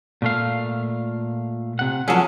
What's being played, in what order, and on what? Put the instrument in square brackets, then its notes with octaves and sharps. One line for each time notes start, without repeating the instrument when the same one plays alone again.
[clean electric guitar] A#2 A3 F5
C3 F#5
[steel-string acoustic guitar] F3 F#3 [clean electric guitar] C#4 G#4 A4